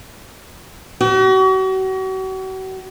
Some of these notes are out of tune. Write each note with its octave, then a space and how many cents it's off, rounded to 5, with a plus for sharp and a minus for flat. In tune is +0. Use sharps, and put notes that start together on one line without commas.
F#4 +40